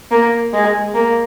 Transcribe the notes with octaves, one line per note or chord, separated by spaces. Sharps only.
A#3
G#3
A#3